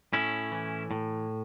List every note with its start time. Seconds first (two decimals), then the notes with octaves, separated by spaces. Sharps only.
0.13 A2 C#4 E4
0.52 E3
0.91 A2